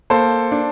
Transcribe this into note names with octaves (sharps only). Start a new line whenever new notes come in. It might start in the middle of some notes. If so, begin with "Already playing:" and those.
A#3 A4 C5
D4